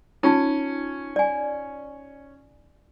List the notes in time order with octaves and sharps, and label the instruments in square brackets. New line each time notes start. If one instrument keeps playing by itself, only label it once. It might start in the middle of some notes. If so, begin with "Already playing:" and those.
[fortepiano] C#4 [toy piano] D#4 F4 A5
[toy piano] D5 G#5